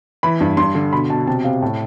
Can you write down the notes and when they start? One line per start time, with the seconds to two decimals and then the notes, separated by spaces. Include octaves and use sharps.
0.23 E3 B5
0.40 G2
0.57 G2 C6
0.75 D3
0.92 B2 B5
1.09 B2 A5
1.27 C3 A5
1.44 C3 F5
1.62 A2 A5